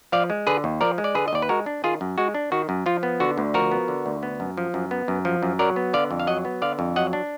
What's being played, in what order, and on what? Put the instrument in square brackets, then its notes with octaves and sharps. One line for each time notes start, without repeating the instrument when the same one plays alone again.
[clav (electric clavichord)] F3 D5 F5
G#3
D3 G#4 B4
D#2
F3 A#4 D5
G#3
D5
D3 G#4 B4
D#5
D#2 D5
B4
G#3 F#4 A#4
D4
D#3 F4 G#4
F#2
G#3 F#4
D4
D#3 F#4
F#2
F3 F4
B3
D3 F#4
D2
F3 F#4 A#4
B3
D3
D2
B3
F#2
F3
F#2
B3
F#2
F3
F#2
F#3 A#4 D5
B3
D3 D5 F5
F2
F5
F#3 D#5 F#5
B3
D3 D5 F5
F2
F#3 D#5 F#5
D4